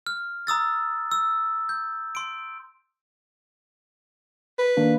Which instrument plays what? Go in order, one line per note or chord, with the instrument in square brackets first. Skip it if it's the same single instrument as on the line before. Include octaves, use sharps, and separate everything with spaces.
[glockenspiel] F6
A#5 D#6 E6 A6
E6
G6
C6 D7
[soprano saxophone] B4
[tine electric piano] D#3 A#3 D4